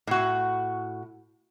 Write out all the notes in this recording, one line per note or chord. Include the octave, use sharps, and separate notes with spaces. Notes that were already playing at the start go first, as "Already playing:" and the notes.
A2 F#4